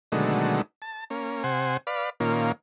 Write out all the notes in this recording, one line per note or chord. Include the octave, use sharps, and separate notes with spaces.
B2 D3 D#3 F#3 G#3 A3
A5
A#3 C#4
C3 C5 F#5 G#5
B4 D5 F5
A#2 D#3 A#3 C#4 F4